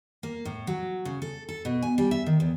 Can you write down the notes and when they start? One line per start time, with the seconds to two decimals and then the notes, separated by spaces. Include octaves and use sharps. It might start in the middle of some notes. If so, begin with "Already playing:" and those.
0.23 A#3
0.45 A2
0.67 F#3
1.05 C#3
1.22 A4
1.49 A4
1.65 B2
1.82 G#5
1.98 G3
2.11 E5
2.26 D#3
2.40 E2